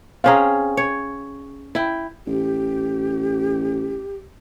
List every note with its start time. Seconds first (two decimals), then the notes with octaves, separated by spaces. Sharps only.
0.24 C4 C#4 G#4 F5 A#5
0.77 C#5
1.75 E4 G5
2.27 A1 G4